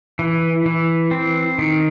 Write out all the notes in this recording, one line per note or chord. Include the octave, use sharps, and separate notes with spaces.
E3
E3
C4
D#3